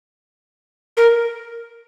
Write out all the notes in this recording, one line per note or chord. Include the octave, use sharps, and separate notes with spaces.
A#4